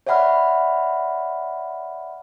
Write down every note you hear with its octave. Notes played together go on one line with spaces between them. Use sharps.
C#5 D5 E5 F#5 B5 F6